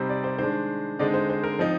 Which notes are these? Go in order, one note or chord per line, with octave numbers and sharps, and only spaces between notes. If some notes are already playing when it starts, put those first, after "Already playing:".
Already playing: C3 G3 C4 D#4 C5
D5
C5
D#3 G#3 D4 C5
D3 G#3 C4 D#4 D5
C5
C5
A#4
F3 C4 D#4